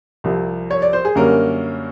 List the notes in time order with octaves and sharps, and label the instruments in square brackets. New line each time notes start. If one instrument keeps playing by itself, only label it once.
[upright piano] C2 C3 F3
C#5
D5
C5
G#4
F#2 D3 G3 A#3 C#4 A#4